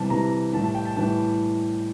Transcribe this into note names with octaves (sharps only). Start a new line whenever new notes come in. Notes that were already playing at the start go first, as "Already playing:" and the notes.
Already playing: C3 E3 G3 A5
C3 E3 G3 A#5
A2 E3 G3 A5
A5
G5
A5
A2 E3 G3 A5